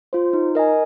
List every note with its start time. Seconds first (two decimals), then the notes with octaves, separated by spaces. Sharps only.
0.13 F4 C5
0.33 D#4
0.55 A#4 D#5 G#5